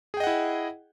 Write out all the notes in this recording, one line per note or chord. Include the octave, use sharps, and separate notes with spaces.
E4 G#4 D#5 F#5 G5